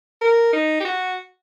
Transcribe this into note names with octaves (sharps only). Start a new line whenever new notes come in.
A#4
D#4
G4
F#4